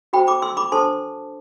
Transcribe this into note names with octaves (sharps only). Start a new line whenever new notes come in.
F#4 C5 G5 B5
B5 D6
C6 E6
B5 D6
D4 A4 C5 A5 C6